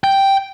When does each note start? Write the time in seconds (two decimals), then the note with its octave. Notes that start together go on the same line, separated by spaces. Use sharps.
0.04 G5